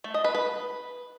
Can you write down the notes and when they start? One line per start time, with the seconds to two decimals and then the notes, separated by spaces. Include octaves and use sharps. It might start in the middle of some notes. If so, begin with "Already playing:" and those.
0.04 A3
0.14 D#5
0.24 B4
0.35 B4